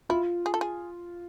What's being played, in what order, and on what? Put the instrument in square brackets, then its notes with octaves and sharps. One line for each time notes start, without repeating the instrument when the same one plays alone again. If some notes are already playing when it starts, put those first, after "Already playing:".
[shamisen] E4 [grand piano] F4
[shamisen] G#4
A4
G#4